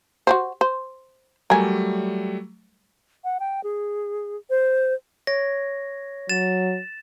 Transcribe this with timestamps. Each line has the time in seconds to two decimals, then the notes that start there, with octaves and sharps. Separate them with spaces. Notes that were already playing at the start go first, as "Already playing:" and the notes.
0.27 F#4 G4 C5
0.61 C5
1.50 F#3 G3 A3 A#4 G#5
3.24 F#5
3.40 G5
3.64 G#4
4.50 C5
5.27 C#5 A#6
6.29 F#3 A6 E7